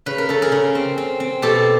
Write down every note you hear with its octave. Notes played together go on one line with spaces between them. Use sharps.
C#3 B4
A#4
C#3 A4
G#4 A#4
C#3
C4
C4
C4
B2 G4 A4